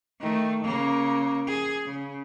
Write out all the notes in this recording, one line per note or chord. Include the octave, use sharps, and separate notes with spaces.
D#3 A3
C#3 A#3
G#4
C#3